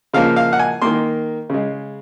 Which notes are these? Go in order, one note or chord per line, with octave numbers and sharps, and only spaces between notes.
C#3 F3 A#3 F5
F5
F#5
G#5
D#3 A#3 C6
C#3 G#3